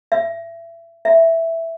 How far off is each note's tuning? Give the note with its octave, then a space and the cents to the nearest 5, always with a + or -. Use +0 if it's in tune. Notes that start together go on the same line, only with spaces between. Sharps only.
E5 +25
E5 +0